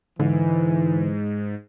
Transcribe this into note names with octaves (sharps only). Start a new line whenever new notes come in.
G#2 D3 E3